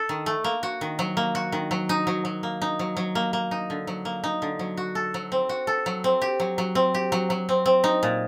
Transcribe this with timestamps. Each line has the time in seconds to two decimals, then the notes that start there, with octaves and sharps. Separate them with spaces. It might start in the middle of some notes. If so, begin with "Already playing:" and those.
Already playing: A4
0.09 D#3
0.26 A3
0.44 A#3
0.63 F#4
0.81 D#3
0.99 F#3
1.17 A#3
1.35 F#4
1.52 D#3
1.71 F#3
1.89 D#4
2.07 F#3
2.25 F#3
2.43 A#3
2.62 D#4
2.79 F#3
2.97 F#3
3.15 A#3
3.33 A#3
3.51 D#4
3.70 D3
3.87 F#3
4.05 A#3
4.24 D#4
4.42 D3
4.59 F#3
4.77 F#4
4.95 A4
5.14 F#3
5.32 C4
5.49 F#4
5.67 A4
5.86 F#3
6.04 C4
6.22 G4
6.40 F#3
6.58 F#3
6.75 C4
6.94 G4
7.12 F#3
7.30 F#3
7.49 C4
7.66 C4
7.84 D#4
8.03 A#2